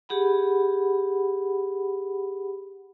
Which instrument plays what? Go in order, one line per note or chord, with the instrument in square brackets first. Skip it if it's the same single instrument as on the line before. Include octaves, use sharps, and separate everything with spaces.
[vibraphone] G4 G#4 F#5 B5